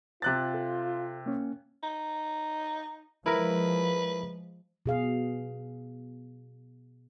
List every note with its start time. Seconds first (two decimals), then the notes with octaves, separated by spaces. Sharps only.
0.22 C3 F4 F#6 A6
0.54 A4
1.26 A#3 C#4
1.83 D#4
3.26 F3 G#3 E4 A#4 B4
4.86 B2 G#4 F5